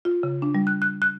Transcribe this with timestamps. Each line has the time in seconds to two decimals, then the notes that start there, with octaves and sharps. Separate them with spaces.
0.05 F4
0.23 C#3
0.42 D4
0.55 G3
0.67 F#6
0.82 F#6
1.02 F#6